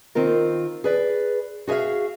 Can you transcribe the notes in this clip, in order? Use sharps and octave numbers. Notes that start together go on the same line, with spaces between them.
D#3 C4 F4 A#4
G#4 B4 D5
F#4 G#4 C#5 E5 F5